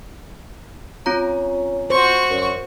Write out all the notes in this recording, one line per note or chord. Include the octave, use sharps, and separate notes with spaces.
C4 C#4 F4 A#5
F#4 C5 C#6
F#2